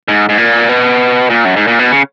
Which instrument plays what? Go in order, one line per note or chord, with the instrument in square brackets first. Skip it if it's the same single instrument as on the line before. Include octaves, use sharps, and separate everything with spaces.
[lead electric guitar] G#2
G#2
A#2
B2
A#2
F#2
G#2
A#2
B2
C#3